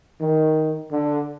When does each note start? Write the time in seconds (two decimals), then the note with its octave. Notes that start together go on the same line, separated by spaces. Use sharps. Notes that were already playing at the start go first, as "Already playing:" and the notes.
0.20 D#3
0.92 D3